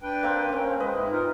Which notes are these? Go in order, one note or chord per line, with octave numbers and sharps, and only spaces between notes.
D4 B4 G5
A#3 C4
A#3 C4 C#4
G#3 B4 D#5
G#2 E4
D#4 F4 A#4